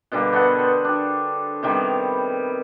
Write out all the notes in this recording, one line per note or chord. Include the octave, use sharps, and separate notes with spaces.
B2 D3 G3 A#3
B3 A4 F#5
C5
D4 G4
C3 D#3 G3 B3